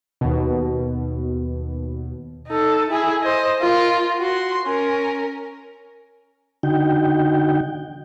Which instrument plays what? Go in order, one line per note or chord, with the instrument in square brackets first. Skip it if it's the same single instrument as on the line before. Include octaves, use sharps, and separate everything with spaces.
[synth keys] D#2 B2
[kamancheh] D#4 A4
E4 G#4
C5 D#5
F4 A#4
F#4 C6
C#4 A#4
[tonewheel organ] D3 D#4 F#4 G5